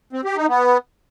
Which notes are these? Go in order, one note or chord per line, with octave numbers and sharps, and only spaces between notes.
C4
G4
D#4
B3